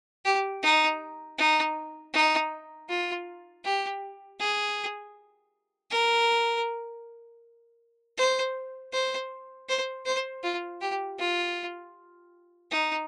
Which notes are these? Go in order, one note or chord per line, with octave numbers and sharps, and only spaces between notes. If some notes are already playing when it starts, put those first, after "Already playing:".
G4
D#4
D#4
D#4
F4
G4
G#4
A#4
C5
C5
C5
C5
F4
G4
F4
D#4